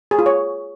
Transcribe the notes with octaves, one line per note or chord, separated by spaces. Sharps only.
G#4
F4
C#5